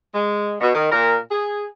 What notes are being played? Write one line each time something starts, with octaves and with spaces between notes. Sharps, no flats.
G#3
B2
D#3
A#2 A#4
G#4